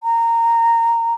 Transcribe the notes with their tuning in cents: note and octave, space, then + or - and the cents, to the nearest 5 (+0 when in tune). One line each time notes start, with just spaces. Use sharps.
A#5 -15